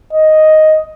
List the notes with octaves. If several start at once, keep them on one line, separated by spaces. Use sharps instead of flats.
D#5